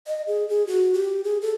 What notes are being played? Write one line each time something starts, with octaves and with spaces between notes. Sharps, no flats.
D#5
G#4
G#4
F#4
G4
G#4
A4